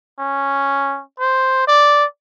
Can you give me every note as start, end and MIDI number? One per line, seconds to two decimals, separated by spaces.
0.19 1.01 61
1.20 1.65 72
1.68 2.05 74